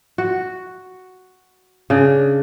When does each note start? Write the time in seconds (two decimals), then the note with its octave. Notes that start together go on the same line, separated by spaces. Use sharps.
0.18 F#4
1.90 C#3 D4